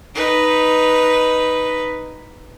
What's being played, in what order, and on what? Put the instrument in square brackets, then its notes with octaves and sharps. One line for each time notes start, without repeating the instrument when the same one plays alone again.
[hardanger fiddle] D#4 B4